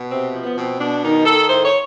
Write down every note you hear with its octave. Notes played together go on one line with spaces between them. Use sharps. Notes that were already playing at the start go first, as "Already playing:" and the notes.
Already playing: B2
C3 C4
F3
B3
B2 C4
B2 D4
D#3 D#4
D#3 A4
A2 C5
C#5